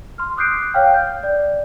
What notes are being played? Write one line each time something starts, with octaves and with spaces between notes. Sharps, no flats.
C6 F6
D6 D#6 F#6 G6 C7 D7
C#5 F5 G5 F6
G6
D5